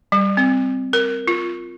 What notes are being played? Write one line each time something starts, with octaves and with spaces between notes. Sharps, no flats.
G3
C4
A#4
F4